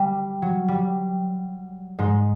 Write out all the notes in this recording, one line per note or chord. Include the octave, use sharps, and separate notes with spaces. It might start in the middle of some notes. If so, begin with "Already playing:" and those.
Already playing: G3
F#3
G3
G#2 G#3